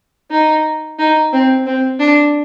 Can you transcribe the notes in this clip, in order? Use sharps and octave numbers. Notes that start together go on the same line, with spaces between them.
D#4
D#4
C4
C4
D4